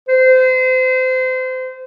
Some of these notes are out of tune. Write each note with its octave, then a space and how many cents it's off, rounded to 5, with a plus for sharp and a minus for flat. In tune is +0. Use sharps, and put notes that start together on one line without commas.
C5 -30